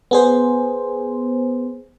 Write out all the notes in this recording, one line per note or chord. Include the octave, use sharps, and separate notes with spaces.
B3 G#4 C5